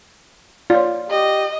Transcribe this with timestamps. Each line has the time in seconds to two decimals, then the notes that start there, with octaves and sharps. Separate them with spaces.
0.70 F4 C#5 D5
1.10 G4 D#5